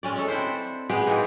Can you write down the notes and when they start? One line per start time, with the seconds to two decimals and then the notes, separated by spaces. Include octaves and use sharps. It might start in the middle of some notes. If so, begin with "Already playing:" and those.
0.03 G#3 C#4 D5
0.15 C#4 A4
0.28 C4 D4 E4 C5
0.90 G#3 B3 G4 G#4
1.07 E3 A#3 C4 D#4